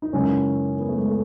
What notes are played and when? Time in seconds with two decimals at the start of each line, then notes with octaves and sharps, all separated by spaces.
0.02 D#4
0.13 F#2 C#3 E3 G#3 C#4
0.79 B3
0.88 A3
0.98 G#3
1.07 A3